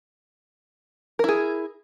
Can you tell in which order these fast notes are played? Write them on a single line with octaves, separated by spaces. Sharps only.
A#4 E4 G#4